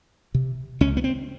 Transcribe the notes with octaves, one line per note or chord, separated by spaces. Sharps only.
C3
C#2 C#4
B3
C4